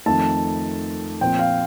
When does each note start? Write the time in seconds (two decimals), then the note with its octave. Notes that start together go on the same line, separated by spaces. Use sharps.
0.06 F2 D#3 A3 A5
1.21 A#2 F3 C4 G5
1.39 F5